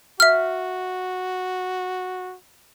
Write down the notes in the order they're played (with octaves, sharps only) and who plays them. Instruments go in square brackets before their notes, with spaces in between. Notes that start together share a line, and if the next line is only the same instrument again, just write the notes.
[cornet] F#4 [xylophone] E5 F6